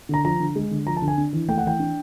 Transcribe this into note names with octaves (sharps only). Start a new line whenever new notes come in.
D3 A#5
F3 A#5
D3
G#3
D3
F3 A#5
A5
D3
G#5
D4
E3
A3 G5
F#5
E3 G5
D4